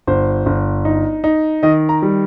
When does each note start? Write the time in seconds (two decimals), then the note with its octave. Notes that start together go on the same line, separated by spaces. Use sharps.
0.07 G1 C5
0.46 G1
0.85 D#4
1.24 D#4
1.63 D#3 D#5
1.89 A#5
2.02 G3